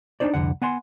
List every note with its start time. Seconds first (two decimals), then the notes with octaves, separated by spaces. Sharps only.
0.20 D4 D#4 C5 D5
0.34 C2 F2 D3 F#5
0.62 B3 F#5 G#5 C6